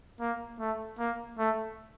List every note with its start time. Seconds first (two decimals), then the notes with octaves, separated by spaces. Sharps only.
0.20 A#3
0.60 A3
0.99 A#3
1.38 A3